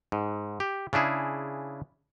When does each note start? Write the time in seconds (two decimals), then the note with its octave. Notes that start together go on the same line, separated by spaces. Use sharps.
0.12 G#2
0.60 G4
0.93 C#3 D4 E4 G#4